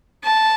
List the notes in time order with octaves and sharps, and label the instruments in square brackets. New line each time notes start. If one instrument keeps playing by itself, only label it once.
[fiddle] A5